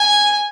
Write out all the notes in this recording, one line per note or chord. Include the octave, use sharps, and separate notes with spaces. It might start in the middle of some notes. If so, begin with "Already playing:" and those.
Already playing: G#5